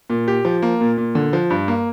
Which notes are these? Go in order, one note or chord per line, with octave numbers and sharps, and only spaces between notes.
A#2
G4
F3
A#3
A#2
A#2
D3
F3
G2
A#3